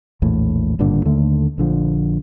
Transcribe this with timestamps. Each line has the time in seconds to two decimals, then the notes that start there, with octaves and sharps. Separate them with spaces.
0.22 A#1 E2 A2
0.79 G#1 G2 A#2 D3
1.05 D#2 D3 A3
1.58 A#1 D3 F3